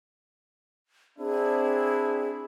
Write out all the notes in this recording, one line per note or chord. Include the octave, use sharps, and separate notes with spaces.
C4 D4 E4 G#4